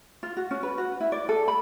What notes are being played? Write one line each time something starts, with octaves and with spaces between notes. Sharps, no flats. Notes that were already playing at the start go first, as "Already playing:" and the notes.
F4
F#4
C#4
B4
F#4
E4
D5
A4
B5